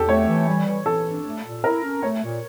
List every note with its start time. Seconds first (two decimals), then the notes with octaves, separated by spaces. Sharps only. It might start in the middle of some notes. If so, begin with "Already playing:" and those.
Already playing: E2 G4 A4
0.08 A3 C#5
0.28 E3
0.47 G3
0.67 E3
0.86 E3 A4
1.05 D4
1.25 A3
1.44 A#2
1.64 E4 A#4
1.83 C#4
2.03 A3 C#5
2.23 A#2